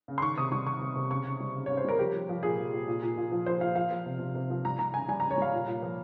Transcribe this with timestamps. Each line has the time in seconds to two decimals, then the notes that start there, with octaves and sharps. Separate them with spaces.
0.08 C#3
0.18 C6
0.22 D#3 C#6
0.37 C3 D#6
0.52 G3 C#6
0.66 D#3 C#6
0.81 C3
0.96 C3
1.11 C#3 C#6
1.25 C#3
1.40 G3
1.55 C#3
1.66 C#5
1.70 C#3
1.77 C5
1.84 G3 A#4
1.99 F3 G4
2.14 F3
2.29 F3
2.43 A#2 G#4
2.58 F3
2.73 A#2
2.88 A#2
3.02 A#2
3.17 A#2
3.32 F3
3.46 F3 C5
3.61 A#2 F5
3.75 F3 F5
3.91 F3
4.06 C3
4.20 C3
4.35 C3
4.50 F3
4.65 G3 A#5
4.79 G3 A#5
4.94 C#3 G#5
5.08 G3 G#5
5.20 A#5
5.24 C#3
5.31 C#5
5.38 G3 F5
5.53 A#2
5.67 A#2
5.82 F3